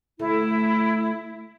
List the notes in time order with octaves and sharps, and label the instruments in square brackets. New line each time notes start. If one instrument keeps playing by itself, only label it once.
[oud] D2 A3 [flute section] E4